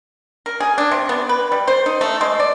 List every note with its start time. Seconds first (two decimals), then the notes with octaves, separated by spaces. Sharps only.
0.46 A#4
0.60 G#4
0.78 D4
0.91 C3
1.09 B3
1.29 B4
1.52 G3
1.67 C5
1.86 D#4
2.01 A3
2.21 G#3
2.40 D5